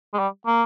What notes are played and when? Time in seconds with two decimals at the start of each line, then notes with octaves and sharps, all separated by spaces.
0.14 G#3
0.19 G3
0.47 A#3